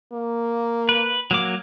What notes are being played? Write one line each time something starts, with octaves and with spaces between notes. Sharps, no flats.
A#3
B4
F#3 A#3 D6